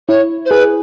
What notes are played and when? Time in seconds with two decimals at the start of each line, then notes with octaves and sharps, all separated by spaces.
0.09 E4 C#5
0.45 C5
0.51 G#4 B4